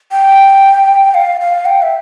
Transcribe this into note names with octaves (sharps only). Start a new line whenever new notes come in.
G5
F5
F5
G5
E5